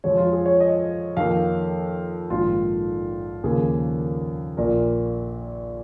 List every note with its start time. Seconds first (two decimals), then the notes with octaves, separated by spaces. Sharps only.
0.04 F2 F3 G#3 C#5
0.17 F4
0.32 G#4
0.46 C#5
0.60 D#5
1.17 F2 D#3 A#3 F5
2.30 A#1 G#2 D#3 G#3 F4
3.43 D#2 C#3 F3 A#3 G#4
4.57 A#1 A#2 A#3 A#4